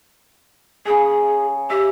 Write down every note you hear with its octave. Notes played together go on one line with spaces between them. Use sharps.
C#3 G#4 G#5
G4 E5